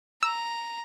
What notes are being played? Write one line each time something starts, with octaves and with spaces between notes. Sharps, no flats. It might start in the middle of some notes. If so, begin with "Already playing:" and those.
A#5 E6